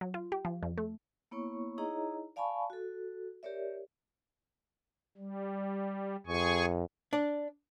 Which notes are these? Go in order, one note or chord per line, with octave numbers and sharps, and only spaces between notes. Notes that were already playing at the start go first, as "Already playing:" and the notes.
F#3
F4
G4
F3
F2
A3
A#3 B3 E4 C#5 C#6
D#4 E4 G#4 C#5 D#5 A#5
D5 F5 G#5 A5 B5 C#6
F#4 A4
G4 A#4 C#5 D5 E5
G3
F2 G#4 G#5 C#6
D4 D5